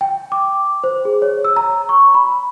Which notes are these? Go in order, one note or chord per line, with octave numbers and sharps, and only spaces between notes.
G5
D6
C5
G#4
C#5
E6
A#5
C#6
B5